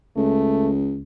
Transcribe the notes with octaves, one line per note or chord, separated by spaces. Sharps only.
C#2 A3